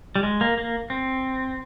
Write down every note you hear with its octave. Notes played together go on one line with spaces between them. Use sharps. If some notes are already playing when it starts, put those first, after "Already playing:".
G3
G#3
A#3
A#3
C4